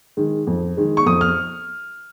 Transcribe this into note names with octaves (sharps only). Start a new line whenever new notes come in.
D#3 G#3
F2
D#3 G#3
C#6
F2 D#6
F6